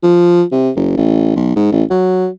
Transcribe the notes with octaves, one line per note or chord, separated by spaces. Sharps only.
F3
C3
F#1
A1
B1
G#2
A1
F#3